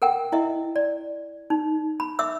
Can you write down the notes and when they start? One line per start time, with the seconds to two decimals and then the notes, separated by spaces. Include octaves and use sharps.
0.02 A4 A#4 F#5 G5
0.32 E4 D#5 E5
0.76 D5
1.50 D#4
2.00 B5
2.19 E5 D6 E6